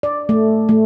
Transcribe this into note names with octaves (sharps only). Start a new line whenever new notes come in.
D5
A3
A3